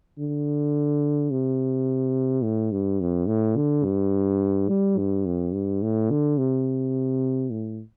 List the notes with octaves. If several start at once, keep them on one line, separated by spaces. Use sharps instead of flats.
D3
C3
A2
G2
F2
A2
D3
G2
G3
G2
F2
G2
A2
D3
C3
A2